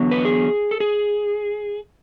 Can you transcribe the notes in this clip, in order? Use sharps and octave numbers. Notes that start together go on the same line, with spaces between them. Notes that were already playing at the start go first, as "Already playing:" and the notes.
Already playing: E2 D3 F#3 B3
B4
G#4
A4
G#4